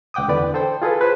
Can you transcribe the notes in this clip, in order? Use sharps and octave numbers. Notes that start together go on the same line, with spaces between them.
C#2 F#5 G5 D6 D#6
E2 D3 B4 D5 B5
A4 C5 G5
F4 G#4 A4 B4
B4 C5